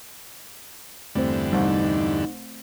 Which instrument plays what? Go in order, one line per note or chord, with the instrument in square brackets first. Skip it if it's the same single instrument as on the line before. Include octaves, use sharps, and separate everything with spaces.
[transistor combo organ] E2 G2 D3 [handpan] A3 C4 C5
[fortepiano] C2 [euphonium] D#4